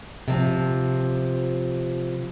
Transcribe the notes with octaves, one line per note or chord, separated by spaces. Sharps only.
C3 F3